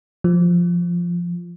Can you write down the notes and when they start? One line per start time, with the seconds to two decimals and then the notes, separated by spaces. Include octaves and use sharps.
0.24 F3